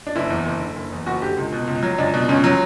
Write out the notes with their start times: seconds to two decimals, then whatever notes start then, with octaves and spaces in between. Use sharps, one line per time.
0.07 D4
0.16 F#1 E4
0.30 E2
0.46 F#1
0.60 D3
0.76 F#1
0.92 E2
1.06 F#1 F#4
1.22 D3 G4
1.37 C#2
1.52 B2
1.67 C#2
1.83 F#3
1.98 C#2 D4
2.14 B2
2.29 C#2 C#4
2.44 F#3